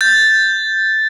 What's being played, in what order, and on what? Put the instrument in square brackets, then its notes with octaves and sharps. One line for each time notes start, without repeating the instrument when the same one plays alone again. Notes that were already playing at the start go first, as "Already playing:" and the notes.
[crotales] G6 A6